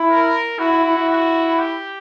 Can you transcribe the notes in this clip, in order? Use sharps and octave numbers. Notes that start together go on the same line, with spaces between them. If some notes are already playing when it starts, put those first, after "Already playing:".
Already playing: E4
A#4
E4 F#4
E4
E4
E4
F#4
G4